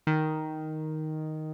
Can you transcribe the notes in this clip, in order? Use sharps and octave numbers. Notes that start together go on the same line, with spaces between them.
D#3